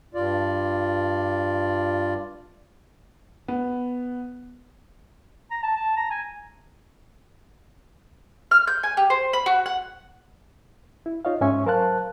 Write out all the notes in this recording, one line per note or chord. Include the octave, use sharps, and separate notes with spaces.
G2 F4 D5
B3
A#5
A5
A5
A#5
G#5
F6
G6
G#5
G4
C5
B5
F#4
F#5
E4
D#4 F4 C#5 D#5 F5
G#2 G#3 C#4 E5 G#5 C#6
F#3 A#4 C5 F5 A5 F#6